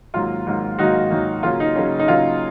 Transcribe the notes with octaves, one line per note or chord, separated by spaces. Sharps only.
G#2 D#3 F#3 A#3 F4
G#2 D#3 F#3 A#3
G#2 D#3 F#3 A#3 D#4 F#4
G#2 D#3 F#3 A#3
C#3 F#3 A#3 C#4 F4
D#4
C#3 F#3 A#3 C#4
D#4
C#3 F#3 A#3 C#4 F4